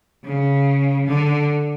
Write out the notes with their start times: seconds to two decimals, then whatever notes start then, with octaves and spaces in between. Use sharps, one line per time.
0.24 C#3
1.06 D3